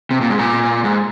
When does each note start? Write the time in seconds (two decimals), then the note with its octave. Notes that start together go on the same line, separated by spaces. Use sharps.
0.11 C3
0.21 A#2
0.30 G#2
0.39 A#2
0.84 G#2